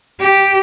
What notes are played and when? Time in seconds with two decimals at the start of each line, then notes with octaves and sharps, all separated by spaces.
0.20 G4